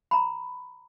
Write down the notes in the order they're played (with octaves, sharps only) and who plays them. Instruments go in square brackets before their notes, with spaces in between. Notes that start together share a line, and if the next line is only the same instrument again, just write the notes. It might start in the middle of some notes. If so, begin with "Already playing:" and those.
[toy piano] A#5 B5